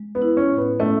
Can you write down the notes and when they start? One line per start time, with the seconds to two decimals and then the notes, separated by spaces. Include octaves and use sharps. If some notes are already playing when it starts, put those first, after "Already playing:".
Already playing: G#3
0.15 B3
0.22 E4
0.37 C#4
0.51 A2
0.58 B3
0.80 A3 C#4